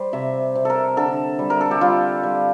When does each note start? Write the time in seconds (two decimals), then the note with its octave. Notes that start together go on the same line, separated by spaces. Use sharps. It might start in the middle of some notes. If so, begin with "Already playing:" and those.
Already playing: G3 C5
0.13 C3 E5
0.55 C3
0.65 A4 A#4
0.97 D3 A4
1.39 G3
1.50 A#4
1.61 A4
1.71 G4
1.81 G3 F4
2.23 G3